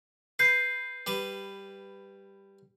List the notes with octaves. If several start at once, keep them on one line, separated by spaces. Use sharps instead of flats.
B4 G6 C7
G3 B4